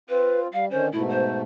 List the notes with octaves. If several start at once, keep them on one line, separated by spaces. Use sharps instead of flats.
C4 F4 B4
G3 F5
D3 D#3 C#4 C5
G#2 B2 A3 E4
C5